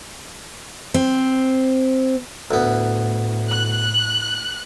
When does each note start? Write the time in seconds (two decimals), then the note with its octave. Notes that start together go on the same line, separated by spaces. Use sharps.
0.94 C4
2.51 D2 A2 B3
3.50 F#6